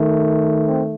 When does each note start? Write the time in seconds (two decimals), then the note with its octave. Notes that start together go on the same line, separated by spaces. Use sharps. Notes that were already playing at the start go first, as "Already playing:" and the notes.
Already playing: D#3 A3
0.66 C4